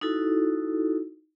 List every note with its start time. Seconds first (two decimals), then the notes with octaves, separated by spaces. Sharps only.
0.01 D#4 E4 F#4 A4